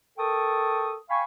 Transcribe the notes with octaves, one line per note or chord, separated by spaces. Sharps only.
A4 A#4 G5 A5 C#6 D#6
F5 G5 G#5 B5 C#6